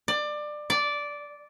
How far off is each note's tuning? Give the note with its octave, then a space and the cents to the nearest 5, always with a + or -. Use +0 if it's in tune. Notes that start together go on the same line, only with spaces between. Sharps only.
D5 +20
D5 -10